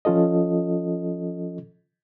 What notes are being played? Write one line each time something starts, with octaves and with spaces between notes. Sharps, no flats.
F3 C#4 F4 A4 D#5